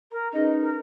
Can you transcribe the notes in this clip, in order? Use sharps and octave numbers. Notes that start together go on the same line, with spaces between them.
A#4 A#5
C#4 D#4 G#4 B4 D#5
A#4